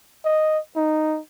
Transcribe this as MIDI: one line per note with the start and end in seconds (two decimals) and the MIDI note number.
0.25 0.59 75
0.76 1.19 63